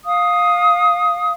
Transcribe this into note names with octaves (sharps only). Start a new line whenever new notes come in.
F5 D#6